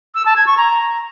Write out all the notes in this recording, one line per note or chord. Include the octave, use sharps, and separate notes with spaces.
E6
A5
G#6
C#6
A#5